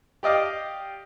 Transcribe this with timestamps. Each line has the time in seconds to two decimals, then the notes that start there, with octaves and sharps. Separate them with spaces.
0.23 G4 D5 D#5 F5